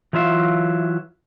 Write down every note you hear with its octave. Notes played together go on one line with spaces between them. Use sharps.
E3 F#3 F4 E5 F5